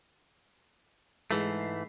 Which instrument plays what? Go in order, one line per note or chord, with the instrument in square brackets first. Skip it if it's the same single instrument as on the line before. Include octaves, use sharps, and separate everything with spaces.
[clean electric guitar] G#2 E3 A3 [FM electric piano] G#3 B6 C7